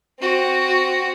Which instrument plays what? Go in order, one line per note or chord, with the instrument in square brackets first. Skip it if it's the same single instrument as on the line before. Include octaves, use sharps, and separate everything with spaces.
[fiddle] C4 F#4